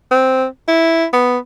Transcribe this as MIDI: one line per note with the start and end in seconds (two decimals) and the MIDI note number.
0.11 0.45 60
0.68 1.06 64
1.13 1.38 59